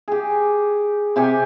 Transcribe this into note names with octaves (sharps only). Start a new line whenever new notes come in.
G4 G#4
C3 G4 G#5 C#6